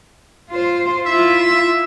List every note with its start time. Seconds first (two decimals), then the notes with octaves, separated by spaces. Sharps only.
0.50 F4 C5
1.06 E4 F4 E5